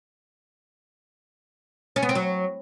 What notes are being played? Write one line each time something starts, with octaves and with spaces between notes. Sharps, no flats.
C#4
B3
C4
F#3